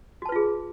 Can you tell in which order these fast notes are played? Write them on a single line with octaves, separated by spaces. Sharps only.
F#4 A5 B4 F4 G#4